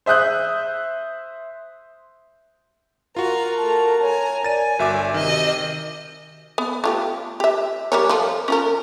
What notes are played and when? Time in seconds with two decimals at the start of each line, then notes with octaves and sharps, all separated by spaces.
0.06 C5 E5 D#6 F#6 G6
3.16 F4 F#4 A#4 A#5
3.57 A3 A5 A#5
4.02 C#5 G#5 A#5
4.44 D5 G#5 A6 D#7
4.79 G1 F#4 E5 D6
5.14 C3 D#3 D#5 E6
6.58 B3
6.84 A3 F4 G4
7.40 G4 E5
7.92 G3 A#4 C#5
8.09 F3 F4 A4
8.48 C#4 F4 A#4